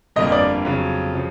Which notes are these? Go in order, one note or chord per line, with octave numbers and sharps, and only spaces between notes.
G1 F2 D3 G3 A#3 D#5
D5
F2 C#3 F#3
C#3 F3